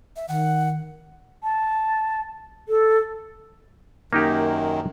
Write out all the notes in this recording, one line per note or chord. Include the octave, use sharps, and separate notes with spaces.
E5
D#3 F#5
A5
A4
F#2 D#3 A#3 D#4 G4